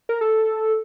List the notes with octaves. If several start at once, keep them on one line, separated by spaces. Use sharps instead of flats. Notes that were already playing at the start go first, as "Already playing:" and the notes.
A#4
A4